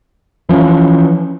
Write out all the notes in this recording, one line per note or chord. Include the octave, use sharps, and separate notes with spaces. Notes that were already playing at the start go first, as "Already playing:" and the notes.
E3 F3 C#4